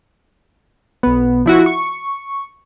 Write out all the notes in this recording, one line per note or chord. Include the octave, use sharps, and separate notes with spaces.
B1 B3
F3 E4 F#4
C#6